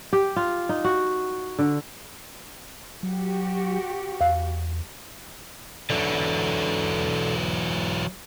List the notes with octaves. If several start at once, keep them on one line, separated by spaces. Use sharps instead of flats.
G4
F4
D#4
F#4
D3
F#3 F#4 G4
E2 F5
E3 F#3 A4 D5